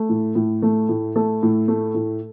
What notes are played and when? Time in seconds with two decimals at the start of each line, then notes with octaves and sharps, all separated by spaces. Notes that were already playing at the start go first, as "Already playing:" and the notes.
Already playing: A3
0.09 A2
0.35 A2
0.62 A3
0.89 A2
1.16 A3 A4
1.43 A2
1.68 A3
1.95 A2